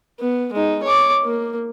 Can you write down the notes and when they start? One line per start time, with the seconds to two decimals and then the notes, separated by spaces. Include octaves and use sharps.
0.20 B3
0.53 G#3 D#4
0.83 C#5 D6
1.24 A#3